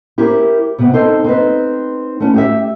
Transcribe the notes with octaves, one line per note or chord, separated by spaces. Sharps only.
E4 G4 A#4 C5
C3 B3
C4 D#4 A4 C5
C4 D#4 B4
A3 C#4 E4
G4 D#5 E5